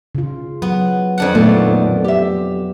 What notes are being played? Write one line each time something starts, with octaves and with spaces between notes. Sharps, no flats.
C#3 F4
F#3 B3
F2 D4 F#5
A#2 D#3 F#3 A3 B3
G4 E5